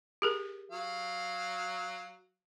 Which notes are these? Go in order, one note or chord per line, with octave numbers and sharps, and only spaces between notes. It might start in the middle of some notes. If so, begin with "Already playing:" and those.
G4 G#4 A#4
F#3 F5